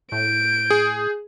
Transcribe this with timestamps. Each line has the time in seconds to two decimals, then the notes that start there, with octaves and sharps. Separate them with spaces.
0.12 A2 G6 D7
0.70 G#4